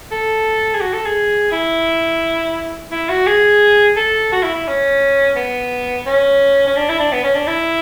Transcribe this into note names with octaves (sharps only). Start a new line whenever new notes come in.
A4
G#4
F#4
A4
G#4
E4
E4
F#4
G#4
A4
F#4
E4
E4
C#4
B3
C#4
C#4
D4
E4
D4
B3
C#4
D4
E4